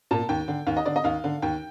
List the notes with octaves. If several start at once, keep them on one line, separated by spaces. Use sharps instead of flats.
A#2 A5
D#2 G5
D3
D#2 F5
D#5
D3 D5
D#5
D#2 F5
D3
D#2 G5